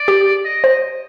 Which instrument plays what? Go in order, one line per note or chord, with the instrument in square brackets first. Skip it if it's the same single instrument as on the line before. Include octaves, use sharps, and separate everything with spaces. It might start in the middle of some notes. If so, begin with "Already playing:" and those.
Already playing: [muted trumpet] D5
[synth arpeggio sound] G4
[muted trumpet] D#5
[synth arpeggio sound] C5